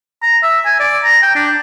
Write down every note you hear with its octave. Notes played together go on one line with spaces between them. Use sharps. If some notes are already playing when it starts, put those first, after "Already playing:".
A#5
E5
G#5
D5
A#5
G5
D4